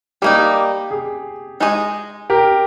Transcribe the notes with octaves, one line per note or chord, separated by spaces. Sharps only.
G3 A#3 D#4 G4
G#4
G#3 D#4 G#4 D#5
G4 A#4